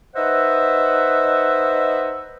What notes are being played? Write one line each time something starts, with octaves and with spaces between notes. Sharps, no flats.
D#4 B4 C5 D#5 E5 F#5